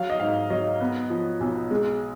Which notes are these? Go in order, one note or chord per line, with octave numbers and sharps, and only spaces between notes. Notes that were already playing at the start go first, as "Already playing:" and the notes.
Already playing: F#3 F5
D#5
G#2 F5
F#3 D#5
B3
F3
B1
G#3